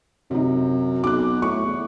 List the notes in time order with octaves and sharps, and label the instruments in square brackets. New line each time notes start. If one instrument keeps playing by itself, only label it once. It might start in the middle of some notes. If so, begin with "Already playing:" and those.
[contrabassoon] F#2 [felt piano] C3 D#4
[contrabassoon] B1 [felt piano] D6 F#6
[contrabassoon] A2 [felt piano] C#6
[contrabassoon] E2